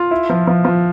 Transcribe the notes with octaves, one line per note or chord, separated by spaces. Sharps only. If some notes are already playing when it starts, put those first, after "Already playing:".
Already playing: F4
E4
F3
F3
F3